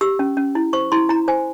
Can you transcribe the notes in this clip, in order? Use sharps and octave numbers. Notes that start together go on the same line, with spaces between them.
G4 E6
C#4
C#4
E4
C5 C#6
E4 C6
E4 A#5
C5 G#5